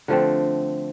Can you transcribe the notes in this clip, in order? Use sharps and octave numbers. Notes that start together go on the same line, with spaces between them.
D3 F3 A3 C4